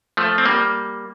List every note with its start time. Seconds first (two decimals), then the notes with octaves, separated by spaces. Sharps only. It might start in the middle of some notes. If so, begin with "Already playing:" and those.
0.17 F3 A3
0.38 C4
0.45 G3 A#3